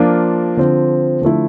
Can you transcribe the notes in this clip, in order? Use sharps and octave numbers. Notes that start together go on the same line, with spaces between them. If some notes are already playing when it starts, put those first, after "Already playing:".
Already playing: F3 A#3 D4 F4
D3 F3 C4
D3 F3 A3 E4